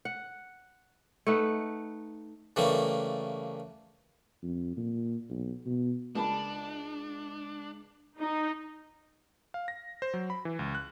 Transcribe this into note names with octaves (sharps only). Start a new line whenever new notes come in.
F#5
A3 D#4 B4 F#5
C#3 E3 G3 A3 A#3
F2
A#2
B1
B2
C#2 D4 A#4 A5 B5
D#4
F5
A#6
C5
F#3
B5
E3
C#2
F#6